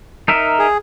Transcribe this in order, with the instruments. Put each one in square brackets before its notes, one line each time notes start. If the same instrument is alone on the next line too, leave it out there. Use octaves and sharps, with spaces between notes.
[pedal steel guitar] D#4 A#4 E5
[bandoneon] G#4